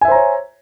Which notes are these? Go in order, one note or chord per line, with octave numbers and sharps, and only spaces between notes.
C5 C#5 E5 G#5 A#5